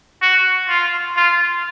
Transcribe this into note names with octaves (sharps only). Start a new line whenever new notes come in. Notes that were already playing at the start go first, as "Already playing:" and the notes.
F#4
F4
F4